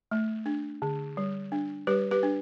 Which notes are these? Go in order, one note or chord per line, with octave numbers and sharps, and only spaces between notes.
A3
D4
D3
G3
D4
G3 G4 B4
G4 B4
D4